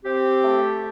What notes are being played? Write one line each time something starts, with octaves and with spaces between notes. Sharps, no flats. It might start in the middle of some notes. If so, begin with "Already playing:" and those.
C4 G4
A3